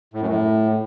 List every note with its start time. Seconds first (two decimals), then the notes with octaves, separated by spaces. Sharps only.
0.14 A2
0.21 F#2
0.28 A2